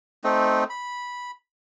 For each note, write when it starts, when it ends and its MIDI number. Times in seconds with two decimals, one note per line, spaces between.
0.24 0.64 57
0.24 0.64 60
0.24 0.64 63
0.70 1.31 83